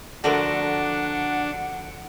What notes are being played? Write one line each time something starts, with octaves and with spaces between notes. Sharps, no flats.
D3 F3 A3 D4 F#4 A#4 F#5